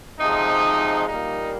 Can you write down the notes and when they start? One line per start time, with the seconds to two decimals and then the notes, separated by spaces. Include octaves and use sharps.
0.19 C3 F3 G#3 D#4
1.07 A#2 G3 A#3 D#4